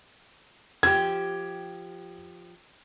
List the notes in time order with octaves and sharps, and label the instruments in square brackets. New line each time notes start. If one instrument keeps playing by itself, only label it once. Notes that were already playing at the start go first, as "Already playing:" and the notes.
[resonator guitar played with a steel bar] F3 G4 [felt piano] G#6